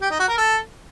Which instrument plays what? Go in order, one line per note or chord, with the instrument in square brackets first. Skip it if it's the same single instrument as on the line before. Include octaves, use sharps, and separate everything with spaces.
[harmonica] G4
D#4
F#4
A#4
A4